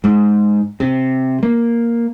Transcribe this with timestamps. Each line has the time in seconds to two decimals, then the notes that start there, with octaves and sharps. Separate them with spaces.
0.04 G#2
0.80 C3
1.43 A#3